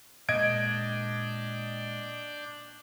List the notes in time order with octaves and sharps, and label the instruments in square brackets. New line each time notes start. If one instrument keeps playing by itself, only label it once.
[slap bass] A#2 G#3 [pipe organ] D4 D5 G5 [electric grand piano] D#5 G#6 D7